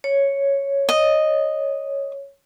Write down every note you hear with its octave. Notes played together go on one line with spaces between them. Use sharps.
C#5
D#5